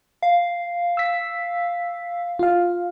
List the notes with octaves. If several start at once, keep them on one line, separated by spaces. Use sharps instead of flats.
F5
E6 B6
F4 F5